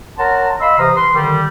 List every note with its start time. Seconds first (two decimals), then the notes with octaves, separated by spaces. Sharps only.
0.19 A#4 C#5 F#5 A5 A#5 C6
0.61 D#5 F5 B5 C6 E6
0.79 C3 E3 C5 A#5 D#6 F6
0.97 B4 C6
1.15 D3 D#3 G3